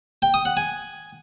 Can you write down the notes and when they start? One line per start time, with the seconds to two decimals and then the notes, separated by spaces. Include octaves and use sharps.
0.22 G5
0.34 D#6
0.45 F#5
0.57 G#5